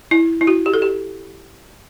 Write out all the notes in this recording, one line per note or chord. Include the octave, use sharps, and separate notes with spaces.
E4
E4
F#4
G4
A4
G4